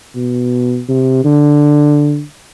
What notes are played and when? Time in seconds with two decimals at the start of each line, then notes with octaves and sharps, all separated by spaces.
0.15 B2
0.89 C3
1.24 D3